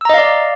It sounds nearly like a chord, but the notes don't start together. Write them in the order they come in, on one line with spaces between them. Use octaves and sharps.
E6 A#5 D#5 F5 D5